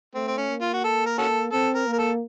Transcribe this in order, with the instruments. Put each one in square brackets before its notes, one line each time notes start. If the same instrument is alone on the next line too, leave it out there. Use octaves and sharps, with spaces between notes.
[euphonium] A3 [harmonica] C4
[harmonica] C4
C#4
[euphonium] A#3
[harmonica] F4
F#4
A4
A#4
C#4 F#4 A4
[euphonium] C4 [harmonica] A4
[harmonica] A#4
[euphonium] A#3
[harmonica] A#4
A4